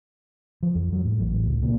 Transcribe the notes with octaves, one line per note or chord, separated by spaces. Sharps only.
F3
F2
F#3
A2
A1
A2
C#2
A#2